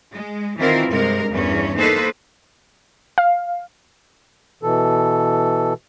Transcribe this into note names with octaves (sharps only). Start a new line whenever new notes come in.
G#3
D#3 E3 C4 E4 F4 A#4
G2 C3 G#3 A#4
E2 G2 C#4
A#3 D#4 A4 B4 C5
F5
B2 E3 A4